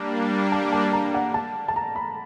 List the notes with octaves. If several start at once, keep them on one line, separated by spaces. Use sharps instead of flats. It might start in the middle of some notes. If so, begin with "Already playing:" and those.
Already playing: G3 A#3 D4
A5
A5
A#5
F#5
A5
A5
A#5
B5